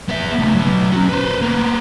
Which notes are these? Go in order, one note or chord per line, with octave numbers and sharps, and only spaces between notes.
B3 E5
C#3 A3
F#3 B3
C#4 F#4
B4 C5
A#3 B3